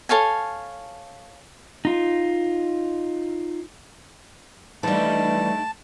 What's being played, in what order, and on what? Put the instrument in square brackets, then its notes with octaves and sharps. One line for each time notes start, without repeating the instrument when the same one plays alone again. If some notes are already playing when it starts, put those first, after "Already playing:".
[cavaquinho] A4 C#5 F5 G#5
[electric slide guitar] D#4 F4
[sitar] G2 D#3 D#4 [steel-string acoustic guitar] E3 G3 [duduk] A3 [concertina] A5